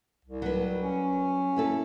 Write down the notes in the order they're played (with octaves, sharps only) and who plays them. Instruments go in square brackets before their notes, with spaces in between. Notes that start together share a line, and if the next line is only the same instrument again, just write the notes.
[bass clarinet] C2
[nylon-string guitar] F#3 G4 B4
[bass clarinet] C#4
[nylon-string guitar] A#3 E4 A4